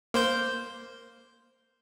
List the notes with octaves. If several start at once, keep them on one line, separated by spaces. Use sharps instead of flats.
A#3 C5 G6